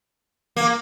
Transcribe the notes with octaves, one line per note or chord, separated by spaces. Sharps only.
A#3